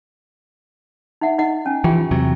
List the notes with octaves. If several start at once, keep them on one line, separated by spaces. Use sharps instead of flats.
D#4 E5 F#5
D#4 D#5 F#5
C#4 G#5
E3 F3 F4 G4 G5
E2 C3 F#3